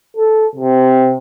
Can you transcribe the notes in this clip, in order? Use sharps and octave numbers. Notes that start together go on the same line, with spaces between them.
A4
C3